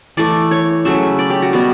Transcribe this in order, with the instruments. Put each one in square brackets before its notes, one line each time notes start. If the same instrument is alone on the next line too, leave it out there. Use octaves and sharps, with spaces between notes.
[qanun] E3 A3 D5
C#5
C#3 F#3 A3 E5
D5
G4
F#4
B2 G3 B3